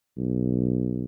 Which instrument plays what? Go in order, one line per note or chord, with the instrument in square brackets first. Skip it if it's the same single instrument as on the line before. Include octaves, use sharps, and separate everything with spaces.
[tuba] B1